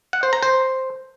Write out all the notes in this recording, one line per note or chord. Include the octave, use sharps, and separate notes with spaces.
F#5
C5
A#5
C5